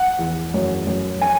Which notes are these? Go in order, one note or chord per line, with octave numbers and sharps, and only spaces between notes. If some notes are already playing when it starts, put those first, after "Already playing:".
Already playing: F#5
E2
F#2
F#2
G#5